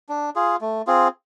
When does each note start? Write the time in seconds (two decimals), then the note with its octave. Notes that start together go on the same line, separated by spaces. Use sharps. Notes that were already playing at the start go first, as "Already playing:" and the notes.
0.09 D4
0.36 F4 G#4
0.61 A3
0.87 C4 F4 G#4